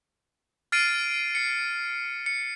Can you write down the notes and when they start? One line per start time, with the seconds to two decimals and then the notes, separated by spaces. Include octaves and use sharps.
0.72 F6 A6 C7 D7 D#7
1.35 C7 C#7
2.26 C#7